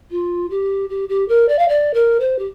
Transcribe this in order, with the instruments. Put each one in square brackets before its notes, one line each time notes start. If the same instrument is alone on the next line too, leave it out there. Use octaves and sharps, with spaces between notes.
[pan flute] F4
G4
G4
G4
A#4
D5
F5
D5
A#4
C5
G4